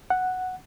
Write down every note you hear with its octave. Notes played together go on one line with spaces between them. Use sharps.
F#5